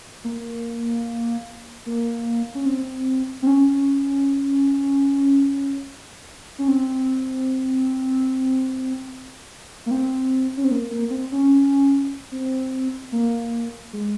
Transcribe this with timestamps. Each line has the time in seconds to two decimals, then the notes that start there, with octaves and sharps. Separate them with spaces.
0.24 A#3
1.86 A#3
2.55 C#4
2.66 C4
3.42 C4
3.47 C#4
6.59 C#4
6.68 C4
9.86 A#3
9.91 C4
10.57 C#4
10.64 C4
10.71 A#3
10.91 A#3
11.10 C4
11.32 C#4
12.32 C4
13.12 A#3
13.93 G#3